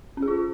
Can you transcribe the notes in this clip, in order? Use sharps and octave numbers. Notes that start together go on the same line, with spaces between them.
C#4
G#4
F4